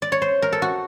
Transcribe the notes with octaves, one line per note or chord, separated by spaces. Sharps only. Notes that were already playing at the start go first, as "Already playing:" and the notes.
D5
C#5
C5
A#4
A4
F#4